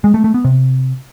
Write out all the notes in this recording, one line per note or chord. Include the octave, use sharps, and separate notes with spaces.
G#3
A3
A3
B3
C3